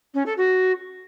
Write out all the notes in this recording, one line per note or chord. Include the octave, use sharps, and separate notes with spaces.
C#4
A4
F#4